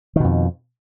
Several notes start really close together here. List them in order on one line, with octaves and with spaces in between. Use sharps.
D#3 B2 F2